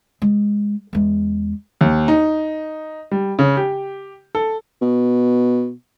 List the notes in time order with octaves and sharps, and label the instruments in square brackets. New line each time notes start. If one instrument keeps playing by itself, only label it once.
[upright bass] G#3
E2 G#3
[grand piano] D#2
D#4
G3
C#3
G4
A4
[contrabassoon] B2